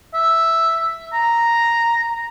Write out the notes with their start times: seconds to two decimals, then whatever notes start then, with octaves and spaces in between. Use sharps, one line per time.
0.14 E5
1.13 A#5